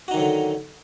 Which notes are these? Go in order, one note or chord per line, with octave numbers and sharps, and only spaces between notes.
D3 D#3 F#3 D#4 F#4